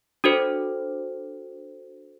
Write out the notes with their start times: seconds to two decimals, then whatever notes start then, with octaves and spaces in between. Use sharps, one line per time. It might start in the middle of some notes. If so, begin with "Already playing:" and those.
0.24 D4 F#4 A4 C5